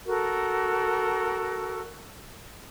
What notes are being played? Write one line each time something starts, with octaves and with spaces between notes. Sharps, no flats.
F#4 A4 A#4